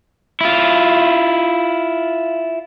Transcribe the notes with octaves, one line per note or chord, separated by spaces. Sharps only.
E4 F4